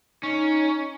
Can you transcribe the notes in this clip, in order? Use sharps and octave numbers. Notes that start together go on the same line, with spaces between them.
C#4 D#4